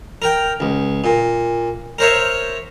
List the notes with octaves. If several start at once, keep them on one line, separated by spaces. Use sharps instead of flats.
A#4 G5
C#2
A#2
A#4 C5 C#5 E5